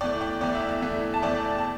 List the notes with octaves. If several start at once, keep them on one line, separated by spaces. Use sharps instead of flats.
E2 E3 A3 D5 G5
D5 G5
E2 E3 A3 D5 G5
E5
E5
E2 E3 A3
A5
E2 E3 A3 D5 G5
A5